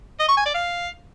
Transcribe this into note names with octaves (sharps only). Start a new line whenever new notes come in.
D#5
C#6
G#5
D5
F5